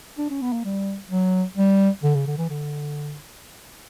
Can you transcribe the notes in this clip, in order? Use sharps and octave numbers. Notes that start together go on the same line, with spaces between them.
D4
C#4
B3
A#3
G3
F#3
G3
D3
C#3
D3
E3
D3